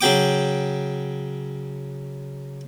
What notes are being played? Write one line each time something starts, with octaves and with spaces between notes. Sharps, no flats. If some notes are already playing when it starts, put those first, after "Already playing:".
C#3 F#3 G5 D6